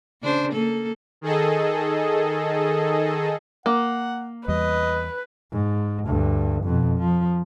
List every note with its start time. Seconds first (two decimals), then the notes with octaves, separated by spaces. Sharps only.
0.22 C#3 D4 C5
0.52 A#3 A4
1.21 D#3 G#4 A4 D#5
3.66 A#3 F#5
4.48 E2 G3 B4 D#5
5.52 G#2
6.06 D2 G2
6.64 F2 B2
6.98 F3